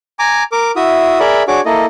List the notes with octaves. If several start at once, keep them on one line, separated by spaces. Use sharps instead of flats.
G#5 A#5 D6
A#4 D6
E4 F#4 E5 D#6
G#4 A#4 D5 E5 B5
D4 F#4 G#4 C#5 D6
A#3 E4 A4 D#5